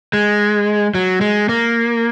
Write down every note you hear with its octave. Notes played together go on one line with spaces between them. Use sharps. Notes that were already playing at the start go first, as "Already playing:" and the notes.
G#3
F#3
G#3
A#3